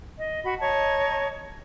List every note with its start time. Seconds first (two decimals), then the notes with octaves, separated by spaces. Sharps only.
0.17 D#5
0.43 F#4 B5
0.60 C#5 D#5 A5 A#5